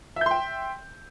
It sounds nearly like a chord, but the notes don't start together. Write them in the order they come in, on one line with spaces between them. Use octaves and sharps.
E5 G6 C6 G5